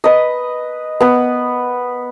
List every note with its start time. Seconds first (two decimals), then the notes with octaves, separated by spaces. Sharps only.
0.04 B4 D#5
1.00 B3 B4